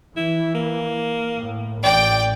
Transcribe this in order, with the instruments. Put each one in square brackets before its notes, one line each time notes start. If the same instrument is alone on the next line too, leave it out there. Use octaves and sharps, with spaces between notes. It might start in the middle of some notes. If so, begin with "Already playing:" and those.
[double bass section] E3 [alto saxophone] E4
[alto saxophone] A#3
[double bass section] A2
[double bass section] A1 [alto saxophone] D5 [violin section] G5